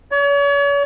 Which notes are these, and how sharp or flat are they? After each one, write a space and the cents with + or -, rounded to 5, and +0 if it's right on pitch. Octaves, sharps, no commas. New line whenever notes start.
C#5 +40